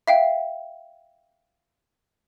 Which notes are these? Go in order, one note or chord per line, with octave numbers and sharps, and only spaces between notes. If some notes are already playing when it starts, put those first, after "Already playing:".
E5 F5 G5